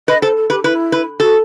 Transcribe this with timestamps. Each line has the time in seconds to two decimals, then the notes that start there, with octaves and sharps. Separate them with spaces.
0.08 B4 D#5
0.22 A4 C5
0.36 A4
0.50 G4 B4
0.64 E4 B4
0.92 B4
1.20 F#4 A4